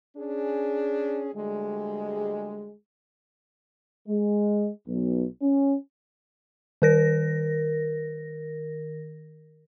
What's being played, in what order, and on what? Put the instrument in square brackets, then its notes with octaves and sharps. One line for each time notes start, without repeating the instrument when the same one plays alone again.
[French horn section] C#4 D4 G#4
D2 G3 G#3
[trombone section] G#3
B1
C#4
[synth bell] D#3 A#4 A#6